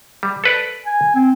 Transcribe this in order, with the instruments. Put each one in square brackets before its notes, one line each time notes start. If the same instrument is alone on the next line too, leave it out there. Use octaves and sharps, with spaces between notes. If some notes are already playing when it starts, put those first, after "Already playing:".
[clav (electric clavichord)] G3
A4 B4 D5
[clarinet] G#5
C4